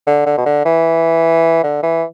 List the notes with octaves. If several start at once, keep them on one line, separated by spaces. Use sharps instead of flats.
D3
D3
B2
D3
E3
D3
E3